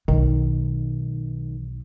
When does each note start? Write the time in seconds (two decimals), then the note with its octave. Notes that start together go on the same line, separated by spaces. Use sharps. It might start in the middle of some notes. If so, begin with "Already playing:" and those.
0.08 B1 D#3